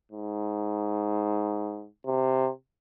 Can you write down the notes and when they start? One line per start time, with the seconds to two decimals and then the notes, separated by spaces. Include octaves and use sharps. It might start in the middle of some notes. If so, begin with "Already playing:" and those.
0.12 G#2
2.07 C3